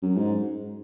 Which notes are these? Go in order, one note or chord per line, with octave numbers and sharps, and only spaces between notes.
F#2
G#2